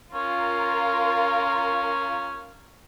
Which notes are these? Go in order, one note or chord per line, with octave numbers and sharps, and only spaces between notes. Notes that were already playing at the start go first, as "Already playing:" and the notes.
C#4 F4 A#4